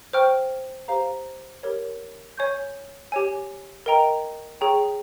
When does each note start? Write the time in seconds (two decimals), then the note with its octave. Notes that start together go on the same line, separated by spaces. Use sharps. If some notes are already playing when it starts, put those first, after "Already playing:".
0.13 C5 G5 C#6 F6
0.88 G4 C5 F5 A#5
1.63 G4 A#4 C#5
2.37 C#5 G#5 C#6 G6
3.12 G4 C#5 G#5
3.86 A#4 D#5 G5 A#5
4.61 G#4 C#5 G5 A#5 C#6